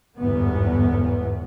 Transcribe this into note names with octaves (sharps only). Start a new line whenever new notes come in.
G1 E2 G#2 B3